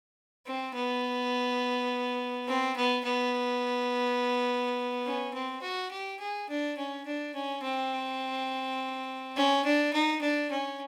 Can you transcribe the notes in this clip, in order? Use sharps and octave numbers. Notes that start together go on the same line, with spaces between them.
C4
B3
C4
B3
B3
C#4
C4
F#4
G4
G#4
D4
C#4
D4
C#4
C4
C#4
D4
D#4
D4
C#4